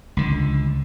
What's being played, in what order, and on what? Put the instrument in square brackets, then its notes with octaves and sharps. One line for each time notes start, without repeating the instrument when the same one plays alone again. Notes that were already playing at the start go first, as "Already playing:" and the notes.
[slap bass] C#2 D3